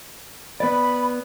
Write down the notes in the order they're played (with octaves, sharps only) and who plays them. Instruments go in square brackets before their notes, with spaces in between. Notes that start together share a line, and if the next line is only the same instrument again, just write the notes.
[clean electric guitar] B3 D5 [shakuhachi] B5